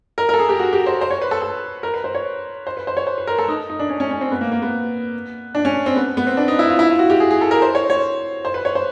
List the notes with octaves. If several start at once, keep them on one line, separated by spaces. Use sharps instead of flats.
A#4
A#4
A4
G#4
G4
F#4
G4
C5
C5
C#5
B4
A4
A4
A#4
B4
C5
C#5
C5
B4
C5
C#5
C5
B4
A#4
A4
D#4
D#4
D4
C#4
C#4
C#4
C4
B3
A#3
A#3
B3
D4
C#4
C4
B3
B3
C4
D4
D#4
E4
F4
E4
F4
F#4
G4
G#4
G#4
A4
A#4
C5
C#5
C#5
C5
B4
C#5
C5